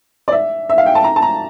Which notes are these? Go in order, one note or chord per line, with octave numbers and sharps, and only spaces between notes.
D5
E5
E5
F5
G5
A5
A#5
A5
A#5